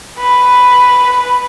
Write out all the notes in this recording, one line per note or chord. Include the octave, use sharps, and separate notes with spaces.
B4